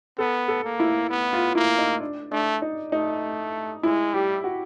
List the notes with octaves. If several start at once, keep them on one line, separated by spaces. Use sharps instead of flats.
B3 A4
A4
A#3
E4
B3
F4
A#3 E4
D#4
D4
A3 D4
D#4
A3 D#4
G#3 E4
G3 G4
F#4